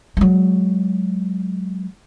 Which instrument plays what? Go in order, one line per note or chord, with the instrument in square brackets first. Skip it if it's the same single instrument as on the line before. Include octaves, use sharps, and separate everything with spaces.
[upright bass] F#3 G#3